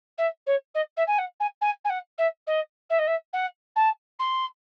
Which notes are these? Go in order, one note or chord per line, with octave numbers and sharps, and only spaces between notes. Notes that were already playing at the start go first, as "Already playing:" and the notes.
E5
C#5
D#5
E5
G#5
F#5
G#5
G#5
G#5
F#5
E5
D#5
E5
D#5
E5
F#5
A5
C6